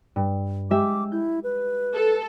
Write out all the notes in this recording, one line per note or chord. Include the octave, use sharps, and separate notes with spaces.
G2
G#3 G4 E5 D6
E4 G6
B4
A4